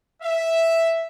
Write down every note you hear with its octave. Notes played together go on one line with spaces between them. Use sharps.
E5